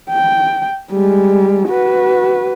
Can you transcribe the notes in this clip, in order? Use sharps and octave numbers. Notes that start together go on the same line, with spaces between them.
G5
G3 G#3
F#4 B4